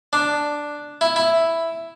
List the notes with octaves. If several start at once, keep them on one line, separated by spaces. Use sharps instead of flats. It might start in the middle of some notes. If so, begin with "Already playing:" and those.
D4
E4
E4